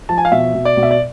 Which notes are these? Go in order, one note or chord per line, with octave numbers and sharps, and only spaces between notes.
F3 A5
G#5
F5
B2 E5
B2
D5
B2
E5
D5